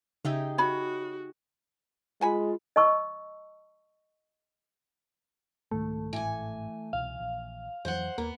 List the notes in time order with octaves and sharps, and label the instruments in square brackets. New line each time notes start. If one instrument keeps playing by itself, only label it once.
[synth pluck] C#3 E5 [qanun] D#4 G4 G#4
[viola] F#4 [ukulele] C#5 B5
[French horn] G#3 [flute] F4 [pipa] F#5 G#5 B5
[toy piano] D#5 A5 C#6 E6
[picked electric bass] C2 G#2 D#3 [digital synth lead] A3
[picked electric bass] G#1 A2 [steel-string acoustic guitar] E3 G#5
[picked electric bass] C2 B2 [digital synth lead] F5
[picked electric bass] A#1
[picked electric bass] F2 E3 F#3 [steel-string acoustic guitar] C5 F#5
[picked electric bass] D#2 [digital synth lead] A#3 [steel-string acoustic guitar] B3